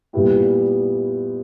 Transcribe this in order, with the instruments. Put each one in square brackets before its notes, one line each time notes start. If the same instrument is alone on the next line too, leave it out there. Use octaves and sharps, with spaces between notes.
[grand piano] A#2 G3 B3 E4 G4